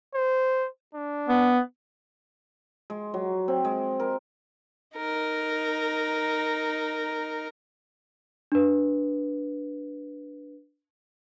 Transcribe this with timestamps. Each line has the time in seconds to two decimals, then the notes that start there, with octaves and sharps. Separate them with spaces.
0.14 C5
0.95 D4
1.29 B3
2.90 G#3
3.14 F#3
3.48 C4
3.64 G#3
4.00 A#4
4.96 D#4 A#4
8.52 D4 B4